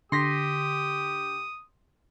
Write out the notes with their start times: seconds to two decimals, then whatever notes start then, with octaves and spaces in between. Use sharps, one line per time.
0.12 D3 G4 C6 D#6 A#6 B6